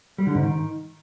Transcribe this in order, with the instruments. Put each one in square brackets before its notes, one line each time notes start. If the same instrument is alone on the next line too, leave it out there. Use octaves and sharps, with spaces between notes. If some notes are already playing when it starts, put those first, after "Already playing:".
[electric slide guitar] G3
D3
G#2
D#3